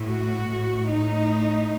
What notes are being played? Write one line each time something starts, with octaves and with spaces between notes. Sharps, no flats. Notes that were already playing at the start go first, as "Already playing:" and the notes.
Already playing: A2
F#4
A2
D#4